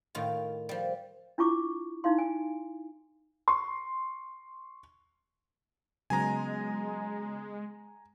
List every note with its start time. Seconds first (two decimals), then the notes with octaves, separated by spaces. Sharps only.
0.15 A2 D#3 F4
0.69 F3 G3
1.38 D4 E4 F4 C#6 D6
2.04 D#4 E4 F5 C6
2.18 G#5
3.48 C6 C#6
6.10 C#3 F#3 G#3 B3 G#5 A#5